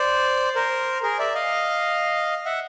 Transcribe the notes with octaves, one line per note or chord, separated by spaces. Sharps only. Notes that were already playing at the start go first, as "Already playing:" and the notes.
Already playing: C5 D5
A#4 C5
G#4 A#4
D5 E5
D#5 F5
E5 F#5